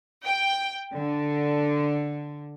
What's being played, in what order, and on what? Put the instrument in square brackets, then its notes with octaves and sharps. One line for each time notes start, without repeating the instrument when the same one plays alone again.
[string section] G5
D3